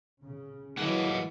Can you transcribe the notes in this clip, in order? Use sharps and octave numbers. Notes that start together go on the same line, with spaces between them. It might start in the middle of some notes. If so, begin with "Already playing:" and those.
C#3
E3 F#3 G#3 A#3 D#5 F#5